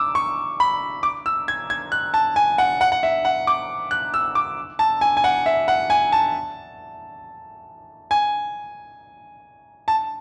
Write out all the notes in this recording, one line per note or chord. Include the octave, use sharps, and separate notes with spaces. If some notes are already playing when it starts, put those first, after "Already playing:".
Already playing: D6 E6
C#6
B5
D6
E6
G#6
G#6
F#6
A5
G#5
F#5
F#5
F#5
E5
F#5
D6
F#6
E6
D6
A5
G#5
G#5
F#5
E5
F#5
G#5
A5
G#5
A5